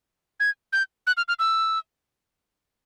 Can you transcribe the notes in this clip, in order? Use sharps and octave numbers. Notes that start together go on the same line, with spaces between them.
G#6
G6
F#6
F6
F6
E6